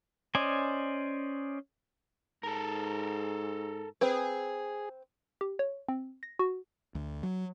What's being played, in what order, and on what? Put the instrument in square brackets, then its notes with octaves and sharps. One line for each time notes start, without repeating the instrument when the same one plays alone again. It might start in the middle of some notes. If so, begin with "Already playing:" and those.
[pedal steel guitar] C#4 C5 D5 D#5 G#5
[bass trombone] G#2 [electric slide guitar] A4 A#4
[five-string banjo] C4 B4 [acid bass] G#4
[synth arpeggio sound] G4
C#5
C4
A#6
F#4
[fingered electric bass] D2
F#3